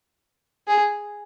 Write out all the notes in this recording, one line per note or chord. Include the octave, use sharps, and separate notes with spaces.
G#4